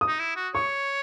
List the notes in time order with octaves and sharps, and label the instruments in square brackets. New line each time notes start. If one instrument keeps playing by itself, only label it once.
[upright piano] D#6
[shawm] D#4
E4
F#4
[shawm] C#5 [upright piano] C#6